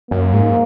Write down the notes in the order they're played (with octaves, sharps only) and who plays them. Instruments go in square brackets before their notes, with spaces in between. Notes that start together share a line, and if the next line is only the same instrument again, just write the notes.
[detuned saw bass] F#2 [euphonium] A#3
[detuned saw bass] G#2